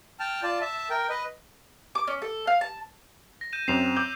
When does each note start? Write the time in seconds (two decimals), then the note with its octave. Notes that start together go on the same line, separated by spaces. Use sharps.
0.20 G5 A5 F6
0.43 F4 D5 A5
0.61 E5 A5
0.90 A#4 G5
1.09 B4 D#5
1.95 D6
2.07 C#4
2.22 A4
2.47 F5
2.61 A5
3.41 A#6
3.53 G6 D#7 E7
3.68 F#2 C4 C7 E7 F7
3.97 D6 E6 G6